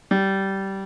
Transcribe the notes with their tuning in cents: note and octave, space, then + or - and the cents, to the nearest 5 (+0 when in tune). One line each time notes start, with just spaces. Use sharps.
G3 -15